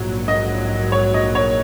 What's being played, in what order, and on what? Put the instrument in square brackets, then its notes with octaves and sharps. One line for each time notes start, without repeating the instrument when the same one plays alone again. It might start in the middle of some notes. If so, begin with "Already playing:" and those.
Already playing: [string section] A#1 G#2 F#3
[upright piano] D#5
C#5
D#5
C#5